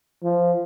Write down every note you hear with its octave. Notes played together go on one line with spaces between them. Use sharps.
F3